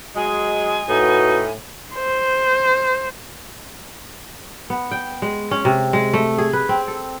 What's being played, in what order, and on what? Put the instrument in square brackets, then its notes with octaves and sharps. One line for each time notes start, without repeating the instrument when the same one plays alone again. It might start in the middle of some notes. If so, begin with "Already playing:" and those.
[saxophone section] F#3 G#3 [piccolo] G#5
[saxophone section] A2 [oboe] D#4 [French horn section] F#4 B4
[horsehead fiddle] C5
[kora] B3
G5
G#3
C#4
C3
G#3
A3
G#4
B4
C4
A4